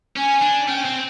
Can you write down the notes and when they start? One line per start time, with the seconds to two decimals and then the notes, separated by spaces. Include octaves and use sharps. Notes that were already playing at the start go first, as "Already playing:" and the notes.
0.16 C#4 G#5
0.42 D4
0.68 C#4 G5
0.85 C4